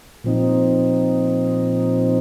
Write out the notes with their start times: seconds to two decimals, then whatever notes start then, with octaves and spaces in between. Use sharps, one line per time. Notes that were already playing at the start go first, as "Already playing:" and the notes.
0.24 A#2 F3 C4 D#4